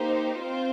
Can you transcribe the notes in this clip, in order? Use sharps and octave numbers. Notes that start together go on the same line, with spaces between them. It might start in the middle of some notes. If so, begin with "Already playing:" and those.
Already playing: A#3 D#4 G4 C5
C4 F4 C5